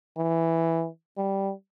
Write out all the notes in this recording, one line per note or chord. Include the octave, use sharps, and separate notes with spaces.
E3
G3